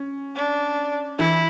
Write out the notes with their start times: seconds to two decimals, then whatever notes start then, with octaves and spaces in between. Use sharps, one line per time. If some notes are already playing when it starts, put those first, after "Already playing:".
Already playing: C#4
0.36 D4
1.19 E3 E4